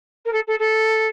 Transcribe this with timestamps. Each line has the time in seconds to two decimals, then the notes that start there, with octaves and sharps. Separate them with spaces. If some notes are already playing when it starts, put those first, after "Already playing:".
0.25 A#4
0.33 A4
0.47 A4
0.59 A4